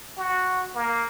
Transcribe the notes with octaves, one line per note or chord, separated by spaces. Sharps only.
F#4
A#3